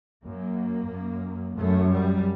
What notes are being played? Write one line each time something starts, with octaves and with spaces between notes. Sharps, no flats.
F#2 A#3
F#2
F#2 A3
G3